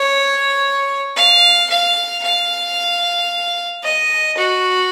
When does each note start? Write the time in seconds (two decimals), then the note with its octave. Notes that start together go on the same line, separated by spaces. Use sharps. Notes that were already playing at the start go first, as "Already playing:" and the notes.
Already playing: C#5
1.16 F5
1.70 F5
2.23 F5
3.83 D#5
4.37 F#4